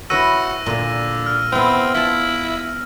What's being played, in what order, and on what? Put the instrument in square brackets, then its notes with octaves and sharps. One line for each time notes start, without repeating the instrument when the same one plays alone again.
[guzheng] E4 B4 C#5 [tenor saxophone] F#4 [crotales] E6 A#6 D#7
[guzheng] A#2 A#3 [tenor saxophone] D3
[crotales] F6
[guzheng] B3 E4 [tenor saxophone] C4
[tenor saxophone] E4 [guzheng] F4 A5